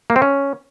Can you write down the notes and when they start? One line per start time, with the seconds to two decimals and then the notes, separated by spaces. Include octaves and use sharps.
0.10 A#3
0.16 C4
0.22 C#4